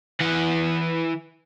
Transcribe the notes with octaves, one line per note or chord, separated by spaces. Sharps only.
E3 F#5